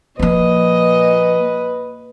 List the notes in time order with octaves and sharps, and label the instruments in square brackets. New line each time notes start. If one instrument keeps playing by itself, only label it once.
[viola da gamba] A#2 D#5 [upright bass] F3 A#3 [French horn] B4